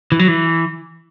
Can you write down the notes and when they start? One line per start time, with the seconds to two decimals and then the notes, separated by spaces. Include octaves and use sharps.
0.12 E3
0.19 F#3
0.28 E3